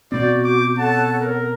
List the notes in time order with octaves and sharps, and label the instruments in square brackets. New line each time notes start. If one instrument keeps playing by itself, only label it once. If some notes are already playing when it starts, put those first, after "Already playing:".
[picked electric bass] B2 C4 [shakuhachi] F#4 [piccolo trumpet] D5 [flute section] G6
[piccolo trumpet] D6
[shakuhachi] A4 [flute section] C#5 F#5 F#6 [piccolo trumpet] A5
[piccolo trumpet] A#4